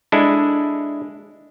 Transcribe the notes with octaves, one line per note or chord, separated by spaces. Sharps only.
G#3 D4 E4 A4